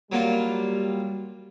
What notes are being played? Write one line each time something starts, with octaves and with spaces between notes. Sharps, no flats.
F#3 G3 A#3 F4